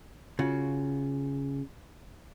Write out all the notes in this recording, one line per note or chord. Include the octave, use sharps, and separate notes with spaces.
C#3 F4 F#4